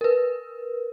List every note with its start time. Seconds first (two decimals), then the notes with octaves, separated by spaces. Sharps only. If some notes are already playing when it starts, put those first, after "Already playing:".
0.01 A#4 B4